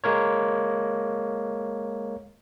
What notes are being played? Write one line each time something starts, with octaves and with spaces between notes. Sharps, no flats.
G#3 A#3 A#4 C#5